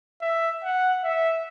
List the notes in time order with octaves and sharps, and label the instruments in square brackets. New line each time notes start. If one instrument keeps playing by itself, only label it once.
[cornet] E5
F#5
E5